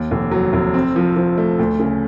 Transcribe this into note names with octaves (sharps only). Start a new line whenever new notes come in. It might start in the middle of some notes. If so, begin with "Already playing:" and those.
Already playing: D#2
F1
F#3
F1
C4
F3
F3
A3
D2
C#3